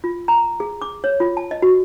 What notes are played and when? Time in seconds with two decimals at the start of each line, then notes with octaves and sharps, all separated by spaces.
0.04 F4
0.28 A#5
0.60 G#4
0.82 D6
1.04 C#5
1.20 F4
1.37 A5
1.51 D#5
1.62 F#4